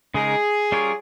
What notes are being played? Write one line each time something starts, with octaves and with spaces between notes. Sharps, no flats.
C#3 G#3 D#4 G#4 A#4
G3 C#4 F4 A#4 C#5